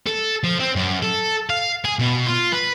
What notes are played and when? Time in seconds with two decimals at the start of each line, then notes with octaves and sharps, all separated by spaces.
0.06 A4
0.44 F3
0.60 C4
0.76 F#2
1.03 A4
1.50 F5
1.85 G#4
1.99 B2
2.26 F4
2.53 B4